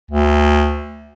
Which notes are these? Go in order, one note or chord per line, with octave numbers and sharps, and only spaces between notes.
D2